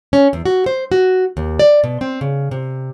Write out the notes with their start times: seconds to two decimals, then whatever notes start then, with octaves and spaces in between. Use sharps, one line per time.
0.13 C#4
0.33 E2
0.45 F#4
0.66 C5
0.92 F#4
1.37 D#2
1.59 D5
1.84 B2
2.01 C4
2.21 C#3
2.51 C3